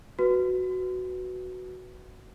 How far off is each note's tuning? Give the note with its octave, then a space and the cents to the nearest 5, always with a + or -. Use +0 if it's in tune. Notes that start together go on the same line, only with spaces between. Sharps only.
F#4 +0 B4 +0